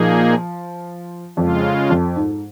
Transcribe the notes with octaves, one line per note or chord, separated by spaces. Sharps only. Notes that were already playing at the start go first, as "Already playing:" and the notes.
Already playing: A#2 F3 A#3 D#4 G#4
F2 C#3 G#3 F4
F2
G#2